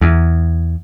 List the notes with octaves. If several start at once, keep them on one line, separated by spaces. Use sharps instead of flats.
E2